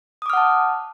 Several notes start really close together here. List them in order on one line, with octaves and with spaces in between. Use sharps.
D#6 D6 F6 F#5 A5